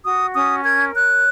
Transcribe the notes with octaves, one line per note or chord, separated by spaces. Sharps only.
F#4 D#6
C#4 D#6
A#4 G#6
C#5 F#6